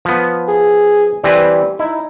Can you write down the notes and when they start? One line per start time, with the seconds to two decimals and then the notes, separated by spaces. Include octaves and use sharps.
0.05 F3 B3
0.48 G#4
1.24 E3 G3 C4 B4
1.79 D#4 E4